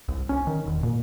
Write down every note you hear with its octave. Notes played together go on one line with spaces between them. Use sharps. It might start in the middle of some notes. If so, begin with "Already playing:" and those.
C2
C#4
D#3
E1
A#2